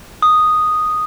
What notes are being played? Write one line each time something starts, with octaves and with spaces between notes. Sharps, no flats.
D#6